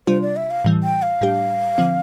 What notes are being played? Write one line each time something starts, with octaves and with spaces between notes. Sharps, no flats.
C3 G3 D4 F4 C5
D5
E5
F5
A2 E3 G3
G5
F5
A2 G3 D4 G4
D3 F3 C4